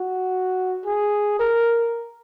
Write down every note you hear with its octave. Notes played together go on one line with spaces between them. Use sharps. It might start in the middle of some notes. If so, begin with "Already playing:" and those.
Already playing: F#4
G#4
A#4